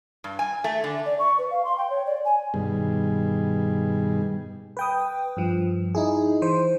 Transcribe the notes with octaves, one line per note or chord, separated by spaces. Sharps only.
G2
G#5
A3
D3
D5
C#6
B4
F5
C6
G5
C#5
D5
G#5
G2 B2 D#3 G3 G#4
B4 G5 D#6
G2 F3
D#4 E4 G#4
E3 C5